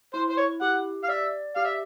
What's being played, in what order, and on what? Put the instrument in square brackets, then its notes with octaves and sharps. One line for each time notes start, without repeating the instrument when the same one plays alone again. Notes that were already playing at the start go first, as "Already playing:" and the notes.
[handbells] E4 [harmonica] C5
[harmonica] C5
C#5
[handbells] G4 [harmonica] F#5
[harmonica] F5
[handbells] D5 [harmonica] E5
[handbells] G4 [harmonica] F5
[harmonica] E5